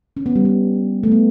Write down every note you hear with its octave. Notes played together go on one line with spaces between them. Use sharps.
C#4
B3
G3
B3
A3
B3